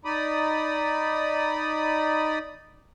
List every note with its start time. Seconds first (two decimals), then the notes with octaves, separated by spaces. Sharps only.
0.05 D#4 D5 B5 D#6